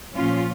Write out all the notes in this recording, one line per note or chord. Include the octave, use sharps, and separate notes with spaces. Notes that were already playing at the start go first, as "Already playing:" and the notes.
A#2 F3 C#4 F4